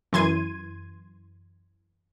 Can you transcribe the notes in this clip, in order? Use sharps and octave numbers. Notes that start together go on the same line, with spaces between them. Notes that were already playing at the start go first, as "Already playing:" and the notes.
F#2 E3 C6 G#6 D#7